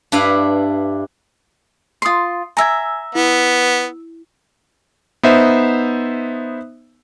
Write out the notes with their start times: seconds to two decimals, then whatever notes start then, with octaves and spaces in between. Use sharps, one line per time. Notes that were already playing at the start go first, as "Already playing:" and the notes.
0.12 G2 D4 E4 B4 F5
2.02 F4 C6 D#6 C7
2.57 E5 G#5 A#5 E6 G#6
3.15 B3 E4
5.23 B3 D#4 C5 E5